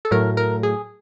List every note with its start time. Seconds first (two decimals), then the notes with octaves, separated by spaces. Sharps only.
0.05 A4
0.11 A2 F#3 A3 A#4
0.37 A#4
0.63 G#4